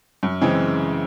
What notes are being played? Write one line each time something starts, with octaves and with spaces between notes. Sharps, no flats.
F#2
C#3 E3 G#3 C4